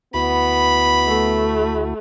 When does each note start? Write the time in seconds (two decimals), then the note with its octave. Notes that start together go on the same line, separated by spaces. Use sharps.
0.14 D2 B3 E4 F#4 B5
1.07 A3